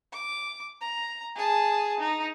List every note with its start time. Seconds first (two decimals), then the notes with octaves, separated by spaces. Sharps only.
0.13 D6
0.81 A#5
1.36 G#4 A5
2.00 D#4